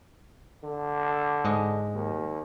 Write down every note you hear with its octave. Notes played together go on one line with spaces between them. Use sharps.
D3
G#2 G#3 D#5
D#2